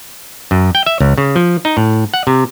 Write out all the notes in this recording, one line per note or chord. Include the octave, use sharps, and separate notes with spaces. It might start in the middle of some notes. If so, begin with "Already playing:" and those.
F#2
G5
E5
C#2
C#3
F3
D#4
A2
F#5
C3